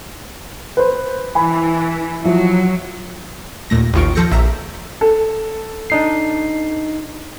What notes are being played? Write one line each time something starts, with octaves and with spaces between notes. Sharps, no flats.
B4 C5
E3 G#5 B5
F3 F#3 E4
D#2 A#2 A3 A#6
A1 D#2 D#3 F4 C#6 D7
F3 A4 G6 A#6 C#7
A#1 E5 A#5
A4
D4 D#4 C7